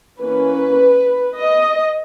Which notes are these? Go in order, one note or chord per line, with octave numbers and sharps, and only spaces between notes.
E3 A#3 C#4 B4
D#5